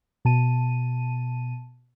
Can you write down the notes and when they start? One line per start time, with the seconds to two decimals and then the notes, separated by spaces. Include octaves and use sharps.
0.25 B2 A5 D#7